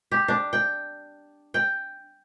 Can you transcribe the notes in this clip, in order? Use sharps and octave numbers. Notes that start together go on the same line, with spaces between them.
G4
D4
G5
G5